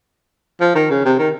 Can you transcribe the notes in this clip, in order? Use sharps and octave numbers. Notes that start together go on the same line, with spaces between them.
F3
D#3
C#3
C3
D#3